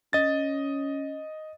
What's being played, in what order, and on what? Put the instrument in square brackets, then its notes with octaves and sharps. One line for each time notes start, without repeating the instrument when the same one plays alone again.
[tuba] C#4 [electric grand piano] D#5 A6